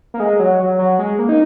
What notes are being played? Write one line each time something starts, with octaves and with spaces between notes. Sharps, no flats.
A#3
G#3
F#3
F#3
F#3
G#3
A#3
D#4